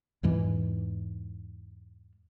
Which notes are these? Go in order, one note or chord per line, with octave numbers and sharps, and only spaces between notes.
E2 G#2 E3 G#3